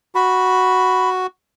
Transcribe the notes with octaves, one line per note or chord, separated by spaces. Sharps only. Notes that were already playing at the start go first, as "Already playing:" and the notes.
F#4 B5